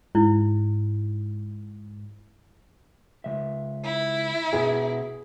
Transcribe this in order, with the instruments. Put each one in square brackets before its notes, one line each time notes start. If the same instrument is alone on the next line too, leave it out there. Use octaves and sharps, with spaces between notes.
[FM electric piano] G#2 [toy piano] E4
[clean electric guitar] C#2 C#3 E5
[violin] E4
[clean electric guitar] B2 B3 E5 [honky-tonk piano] G#4